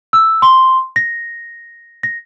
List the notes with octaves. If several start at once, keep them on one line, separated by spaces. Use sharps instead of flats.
E6
C6
A#6
A#6